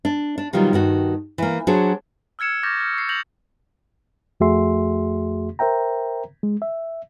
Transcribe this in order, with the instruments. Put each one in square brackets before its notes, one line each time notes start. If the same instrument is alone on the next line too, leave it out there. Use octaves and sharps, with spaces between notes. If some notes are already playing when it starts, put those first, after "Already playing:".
[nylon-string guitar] D4
D4
B2 D#3 F#3 G3 F4
G2 D#3 F#4
E3 A#3
F#3 D4 F#4 G#4 C5
[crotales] E6 F6 G#6 C#7 E7
C#6 D6 F6 G6 A6 A#6
F6
C#6 C7
G6 A#6 F7 F#7
[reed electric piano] F2 A3 F#4 G#4 E5 C6
A#4 C5 E5 G5 A#5
G#3
E5